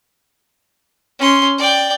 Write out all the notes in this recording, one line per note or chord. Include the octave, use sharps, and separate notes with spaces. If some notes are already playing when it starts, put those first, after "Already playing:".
C#4 C6
D5 G5